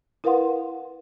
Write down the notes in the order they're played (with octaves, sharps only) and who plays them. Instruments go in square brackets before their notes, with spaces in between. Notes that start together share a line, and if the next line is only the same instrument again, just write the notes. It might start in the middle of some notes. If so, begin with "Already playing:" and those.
[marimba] E4 A#4 B4 F5 F#5 C6